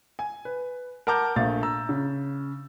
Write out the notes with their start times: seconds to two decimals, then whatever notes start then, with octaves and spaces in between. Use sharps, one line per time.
0.19 G#5
0.45 B4
1.07 A#4 F#5 A5 A#5 D6 G6
1.36 A#1 A3 F5 A6
1.63 A#5 E6
1.89 C#3